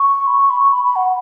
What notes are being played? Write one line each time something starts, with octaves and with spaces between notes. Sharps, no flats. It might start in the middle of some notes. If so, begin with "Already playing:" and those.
Already playing: C#6
B5
C#6
B5
C#6
B5
B5
F#5